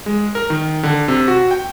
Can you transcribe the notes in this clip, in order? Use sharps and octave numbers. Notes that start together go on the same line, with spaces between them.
G#3
A#4
D#3
D3
C3
F#4
G5